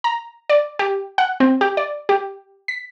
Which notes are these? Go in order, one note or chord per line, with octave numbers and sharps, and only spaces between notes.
A#5
D5
G4
F#5
C4
G4
D5
G4
B6